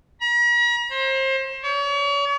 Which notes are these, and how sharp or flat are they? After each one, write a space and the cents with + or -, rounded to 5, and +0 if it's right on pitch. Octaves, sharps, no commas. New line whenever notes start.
A#5 +45
C5 +30
C#5 +40